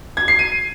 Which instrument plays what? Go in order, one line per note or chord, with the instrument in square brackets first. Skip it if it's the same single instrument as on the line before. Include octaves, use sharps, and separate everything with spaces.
[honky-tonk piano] G#6
C7
D#7